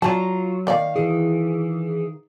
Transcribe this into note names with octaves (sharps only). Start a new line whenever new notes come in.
F#3 F4 D5 F5 A5 A#5
D#3 A#3 D5 F5
E3 G#4